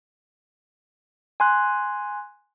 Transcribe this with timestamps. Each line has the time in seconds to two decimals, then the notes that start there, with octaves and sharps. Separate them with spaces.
1.40 G#5 C6 F#6